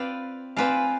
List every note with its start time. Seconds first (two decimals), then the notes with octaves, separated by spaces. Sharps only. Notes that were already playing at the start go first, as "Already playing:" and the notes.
Already playing: C4 F4 B4 D5 F5
0.56 C4 F4 B4 D5 F5 G#5